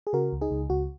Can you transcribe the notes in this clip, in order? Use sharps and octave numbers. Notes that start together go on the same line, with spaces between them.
G#4
C#3 F#4 A#4
C#2
D#4 G#4
C#2
C#2 F#4